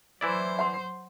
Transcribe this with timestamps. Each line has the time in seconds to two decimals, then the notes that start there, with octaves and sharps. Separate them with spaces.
0.21 E3 F#3 E4 C5 D5
0.59 F#5 C6